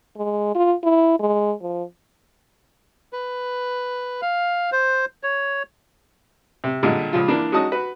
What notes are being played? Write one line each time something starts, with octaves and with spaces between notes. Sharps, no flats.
G#3
F4
E4
G#3
F3
B4
F5
C5
C#5
C3
A#2 D3 G3 G#3
C#2 F3 F4
E3 A#3 D4
G#3 C#4 D#4 F#4 A5 D#6
F#4 B4